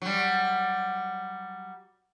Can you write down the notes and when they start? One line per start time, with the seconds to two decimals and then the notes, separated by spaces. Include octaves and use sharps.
0.02 F#3 G3